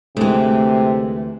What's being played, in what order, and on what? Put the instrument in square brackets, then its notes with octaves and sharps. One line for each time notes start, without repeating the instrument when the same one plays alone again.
[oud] D2 E3 [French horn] C3 [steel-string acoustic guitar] G#3 A3